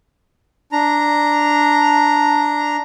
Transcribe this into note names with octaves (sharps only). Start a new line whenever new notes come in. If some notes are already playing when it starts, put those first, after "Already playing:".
D4 A#5